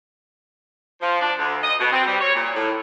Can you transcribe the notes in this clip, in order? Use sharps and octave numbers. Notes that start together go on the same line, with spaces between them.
F3
D4
D2
D#5
B2
C4
G3
C#5
A#2
A2